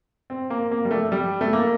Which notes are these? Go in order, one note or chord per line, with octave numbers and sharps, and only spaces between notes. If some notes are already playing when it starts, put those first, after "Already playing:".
C4
A#3
A#3
G3
A3
G3
A3
A#3